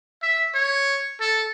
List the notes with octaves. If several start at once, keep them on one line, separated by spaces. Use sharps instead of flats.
E5
C#5
A4